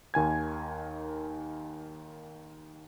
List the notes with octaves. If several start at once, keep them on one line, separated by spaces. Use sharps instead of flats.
D#2 D#3 G#5 G#6